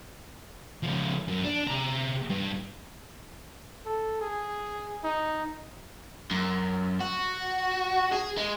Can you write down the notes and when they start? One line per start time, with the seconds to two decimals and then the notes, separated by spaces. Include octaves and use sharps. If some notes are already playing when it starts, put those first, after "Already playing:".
0.83 C#3 F3
1.28 F#2
1.44 D4
1.68 C3 A#5
2.30 G2
3.85 A4
4.21 G#4
5.04 D#4
6.31 F#2
7.01 F#4
8.12 G#4
8.37 G#3